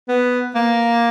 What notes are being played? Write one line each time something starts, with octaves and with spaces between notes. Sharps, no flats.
B3
A#3